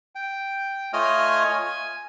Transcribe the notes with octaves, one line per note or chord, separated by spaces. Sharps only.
G5
A3 F4 C#5 D#5 G#5 F6
G#5